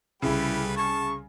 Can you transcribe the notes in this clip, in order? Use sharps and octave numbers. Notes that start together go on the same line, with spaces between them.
C2 C#3 A3 E4 G4 B4
A5 C#6